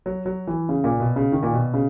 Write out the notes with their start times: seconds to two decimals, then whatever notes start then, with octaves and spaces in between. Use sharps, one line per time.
0.06 F#3
0.26 F#3
0.47 E3
0.69 C#3
0.84 A#2
1.00 B2
1.16 C#3
1.32 D#3
1.43 A#2
1.53 B2
1.74 C#3